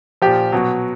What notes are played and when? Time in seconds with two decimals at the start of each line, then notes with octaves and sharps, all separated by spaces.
0.22 A#2 F3 G4
0.52 B2 F#3